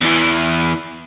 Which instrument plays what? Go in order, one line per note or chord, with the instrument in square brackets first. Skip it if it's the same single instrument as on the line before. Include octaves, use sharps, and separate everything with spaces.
[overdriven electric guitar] E2 E3